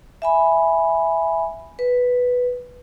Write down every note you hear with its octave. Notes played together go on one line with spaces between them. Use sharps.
E5 G#5 B5
B4